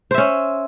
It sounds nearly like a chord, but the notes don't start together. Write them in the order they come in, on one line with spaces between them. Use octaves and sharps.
C5 E5 C#4